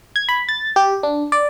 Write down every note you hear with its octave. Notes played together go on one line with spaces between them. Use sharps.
G#6
B5
A6
G4
D4
D5